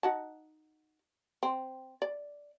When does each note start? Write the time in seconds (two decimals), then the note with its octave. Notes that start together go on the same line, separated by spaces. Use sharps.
0.03 D#4 F#4 A5
1.43 C4
2.02 D5